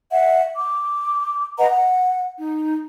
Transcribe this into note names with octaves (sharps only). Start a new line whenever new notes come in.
E5 F#5
D6
B4 D#5 F#5 A#5
F#5
D#4